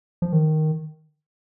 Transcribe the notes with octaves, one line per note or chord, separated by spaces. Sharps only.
F3
D#3